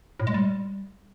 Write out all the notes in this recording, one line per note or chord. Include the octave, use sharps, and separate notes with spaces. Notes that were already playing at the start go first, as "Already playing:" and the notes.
A2
G#3
G3